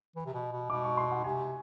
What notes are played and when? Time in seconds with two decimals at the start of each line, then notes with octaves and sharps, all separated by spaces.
0.16 E3
0.26 C3
0.34 B2
0.52 B2
0.70 B2 D6
0.84 C#6
0.97 C6
1.11 F#5
1.24 C3 G#5